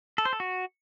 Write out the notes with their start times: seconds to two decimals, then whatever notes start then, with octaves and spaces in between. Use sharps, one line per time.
0.18 A4
0.25 C5
0.33 A4
0.40 F#4